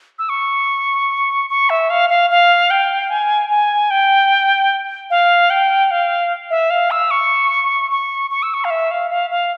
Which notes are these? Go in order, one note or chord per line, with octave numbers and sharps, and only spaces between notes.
E6
C#6
C#6
E5
F5
F5
F5
G5
G#5
G#5
G5
F5
G5
F5
E5
F5
E6
C#6
C#6
C#6
E6
C#6
F5
E5
F5
F5
F5